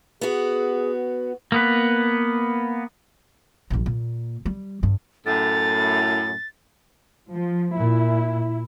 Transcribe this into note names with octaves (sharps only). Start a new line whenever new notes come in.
B3 F#4 G#4
A#3 B3 B4
A#1 G2
A#2
G3
G2
F#2 A2 A6
F3
A#2 E4